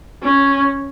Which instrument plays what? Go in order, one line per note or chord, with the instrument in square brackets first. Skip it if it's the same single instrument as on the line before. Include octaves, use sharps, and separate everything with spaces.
[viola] C#4